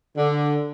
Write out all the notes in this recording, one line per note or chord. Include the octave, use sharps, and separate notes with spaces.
D3